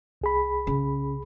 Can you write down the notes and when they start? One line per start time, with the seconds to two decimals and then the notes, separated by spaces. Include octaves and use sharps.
0.21 C2 G#4 B5
0.67 C#3